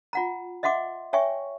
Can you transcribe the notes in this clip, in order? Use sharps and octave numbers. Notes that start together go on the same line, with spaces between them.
F4 F#5 A#5
D#5 E5 F#5 C6 D6
C#5 E5 G5 G#5 C#6